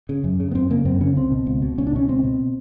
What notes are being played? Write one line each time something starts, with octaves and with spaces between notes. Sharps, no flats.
C#3
F#2
C#3
B3
F#2 C4
C#3 A#3
F#2 C4
C#3 C#4
C#2 C4
B2
C#2
B2
C#2 C#4
D4
B2 C#4
C#2 C4
B2